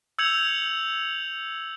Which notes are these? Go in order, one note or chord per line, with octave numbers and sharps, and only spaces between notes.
E6 G6 G#6 C#7 F7 F#7